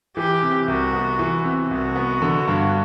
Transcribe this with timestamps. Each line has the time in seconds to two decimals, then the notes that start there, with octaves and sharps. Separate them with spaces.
0.17 E3 G4
0.42 C3
0.68 C2 F#4
0.93 B3
1.19 E3
1.44 C3
1.71 C2 F#4
1.96 B3
2.22 D3
2.48 G2